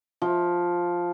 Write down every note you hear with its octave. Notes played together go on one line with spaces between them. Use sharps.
F3